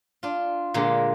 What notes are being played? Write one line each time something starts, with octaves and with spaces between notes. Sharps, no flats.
D4 F4
A#2 D3 G#3 A#3